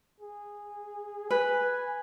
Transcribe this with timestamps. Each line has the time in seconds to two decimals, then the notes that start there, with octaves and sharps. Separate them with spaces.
0.20 G#4
1.31 B4 G#5